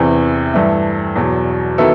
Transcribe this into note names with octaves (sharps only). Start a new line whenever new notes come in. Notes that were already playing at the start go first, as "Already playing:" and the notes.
Already playing: E2 C3 E3
G2 E3 A3
E2 B2 F#3
D#3 F#3 B3 E4 A4